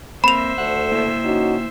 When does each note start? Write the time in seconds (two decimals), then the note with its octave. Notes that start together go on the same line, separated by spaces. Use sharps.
0.24 A#3 C4 C5 E5 B5 F7
0.58 D2 A3 F#5
0.92 A#3 E4
1.24 C#4 D#4 F#4